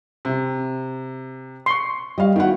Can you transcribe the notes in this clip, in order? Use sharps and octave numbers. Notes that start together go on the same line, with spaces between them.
C3
C6 C#6
G3 D#5 F5
D#3 B3 E4 F#4 F#5